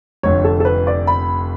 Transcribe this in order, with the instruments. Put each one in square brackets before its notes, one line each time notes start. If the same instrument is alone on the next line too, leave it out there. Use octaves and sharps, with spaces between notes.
[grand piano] F1 F2 D3 [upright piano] C#5
[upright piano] A4
A4
B4
D5
B5